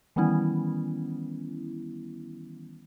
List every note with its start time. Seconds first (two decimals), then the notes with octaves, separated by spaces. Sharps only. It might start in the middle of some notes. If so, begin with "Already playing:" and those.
0.16 D#3 E3 G3 B3 C#4 E4